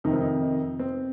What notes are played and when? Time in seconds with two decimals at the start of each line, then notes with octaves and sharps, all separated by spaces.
0.04 F2 C3 D#3 D#4
0.13 C4
0.20 D#4
0.79 C4